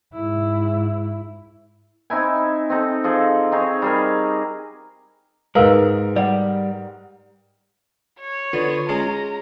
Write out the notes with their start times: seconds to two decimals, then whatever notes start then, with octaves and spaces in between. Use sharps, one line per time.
0.14 G#2 E4
2.10 C4 D#4 E4 G#5
2.70 C4 D#4 A4
3.04 F3 G#4 A4
3.52 C4 D#4 G#4 C#5
3.82 G3 G#4 A#4
5.55 G#2 G#3 A#4 B4 F5 E6
6.16 G3 D5 F#5
8.20 C#5
8.53 D3 B3 F4
8.89 G#3 C#4 G#4 A#5